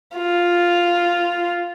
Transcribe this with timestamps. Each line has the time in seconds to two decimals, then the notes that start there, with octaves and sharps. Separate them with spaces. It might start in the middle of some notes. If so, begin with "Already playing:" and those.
0.16 F4